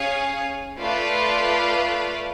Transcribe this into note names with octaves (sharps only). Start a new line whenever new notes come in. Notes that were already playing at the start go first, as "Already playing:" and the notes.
Already playing: C#4 G#4 C#5 F5 G#5
A3 F4 B4 D5 F5